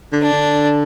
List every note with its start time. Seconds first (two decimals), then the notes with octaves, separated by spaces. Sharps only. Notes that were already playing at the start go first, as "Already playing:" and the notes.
0.12 D3
0.22 D4
0.32 D3